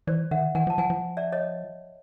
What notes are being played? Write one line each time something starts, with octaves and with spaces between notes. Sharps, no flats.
E3 C5 D5
D#3 E5 F#5
E3 F#5 G#5
F3
A5
F3 F#5 G#5
F3
D5 E5
C#5 D#5